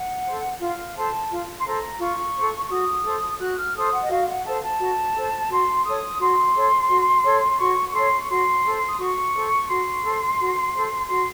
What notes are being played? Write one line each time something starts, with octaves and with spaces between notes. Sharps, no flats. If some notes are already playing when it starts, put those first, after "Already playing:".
Already playing: F#5
A4 C5
F4 F5
A4 C5 A5
F4
C6
A4 C5 A#5
F4 C#6
A4 C5
C#6
F#4 D#6
A4 C5
F#4 F#6
F6
A4 C5 D#6
F#5
D#5
F#4 F5
F#5
A4 C5 A5
A5
F#4
A4 C5
F#4 C6
A4 C#5 D#6
F#4 C6
A4 C#5
F#4
A4 C#5
F#4 C#6
C#6
A4 C#5 C6
C#6
F#4 C6
A4 C5
D#6
F#4 C#6
A4 C5
F#4 C6
A4 C5
F#4
A4 C5
F#4 C6